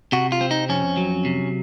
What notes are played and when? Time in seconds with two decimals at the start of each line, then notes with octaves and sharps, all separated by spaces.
0.12 C3 F#4
0.32 F4
0.41 C4
0.51 D#4
0.69 F2 C#4
0.97 F#3
1.25 C3